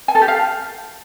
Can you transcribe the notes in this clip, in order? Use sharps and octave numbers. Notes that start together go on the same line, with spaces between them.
G#5
A4
G4
F5